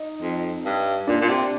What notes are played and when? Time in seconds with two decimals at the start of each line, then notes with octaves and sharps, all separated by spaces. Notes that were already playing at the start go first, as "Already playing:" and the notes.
Already playing: D#4
0.22 F2
0.65 G2
1.07 A#2 D4
1.21 A#2
1.29 C3